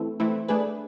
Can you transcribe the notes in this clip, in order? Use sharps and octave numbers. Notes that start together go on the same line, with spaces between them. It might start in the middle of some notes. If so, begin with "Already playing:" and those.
Already playing: E3 A3 C4 E4
E3 A3 C4 E4
A3 D4 G#4 B4